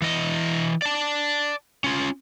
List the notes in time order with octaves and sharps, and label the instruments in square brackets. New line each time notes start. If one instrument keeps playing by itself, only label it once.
[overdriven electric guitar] E3 D#5
D5 A5
C#4 F4